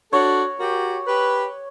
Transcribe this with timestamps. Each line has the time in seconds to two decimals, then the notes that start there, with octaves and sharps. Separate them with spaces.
0.13 D4 F#4 A4 C#5
0.60 F#4 G4 A#4
1.07 G4 B4